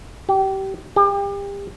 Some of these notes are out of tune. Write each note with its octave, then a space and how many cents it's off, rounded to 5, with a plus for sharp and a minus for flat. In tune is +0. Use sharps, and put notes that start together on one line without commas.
G4 -25
G4 +35